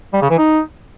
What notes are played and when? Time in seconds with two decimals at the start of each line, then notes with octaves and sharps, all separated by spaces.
0.13 G3
0.22 C#3
0.30 E3
0.38 D#4